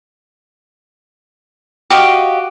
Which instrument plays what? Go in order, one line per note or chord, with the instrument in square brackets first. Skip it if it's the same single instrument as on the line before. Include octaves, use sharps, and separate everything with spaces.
[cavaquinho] F#4 G4 D#5 F5